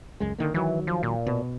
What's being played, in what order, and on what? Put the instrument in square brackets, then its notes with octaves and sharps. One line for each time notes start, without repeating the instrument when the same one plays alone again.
[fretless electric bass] C#2 F#2 G#3
D3 D#3 A#3
[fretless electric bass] D#3 F#3 [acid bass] E3
[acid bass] F3
A#2
[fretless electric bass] B2